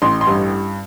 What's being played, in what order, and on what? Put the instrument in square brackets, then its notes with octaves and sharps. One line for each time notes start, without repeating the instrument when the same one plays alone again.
[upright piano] A1 C6
C6
G2